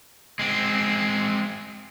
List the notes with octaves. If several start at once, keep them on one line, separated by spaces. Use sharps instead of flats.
G#3 C4